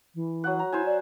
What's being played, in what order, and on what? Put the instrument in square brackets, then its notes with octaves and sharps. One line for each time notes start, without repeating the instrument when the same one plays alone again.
[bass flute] E3
[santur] F#3 F#5
A#5
[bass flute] E4 [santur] C5 E5 G#5
[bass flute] D5